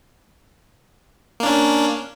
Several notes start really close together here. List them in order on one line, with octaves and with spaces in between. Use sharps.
A#3 D4 C#4